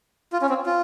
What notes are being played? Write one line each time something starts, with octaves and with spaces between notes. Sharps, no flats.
F4
C#4
C4
F4